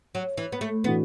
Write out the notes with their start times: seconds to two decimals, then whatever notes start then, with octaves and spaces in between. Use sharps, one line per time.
0.15 F#3
0.37 E3
0.52 B3
0.61 A3
0.84 A2 E3 B3 D4 F#4